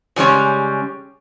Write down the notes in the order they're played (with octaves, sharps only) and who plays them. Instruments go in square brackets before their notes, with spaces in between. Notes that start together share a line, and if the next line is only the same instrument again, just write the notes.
[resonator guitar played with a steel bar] C#3 G3 G#3 C#4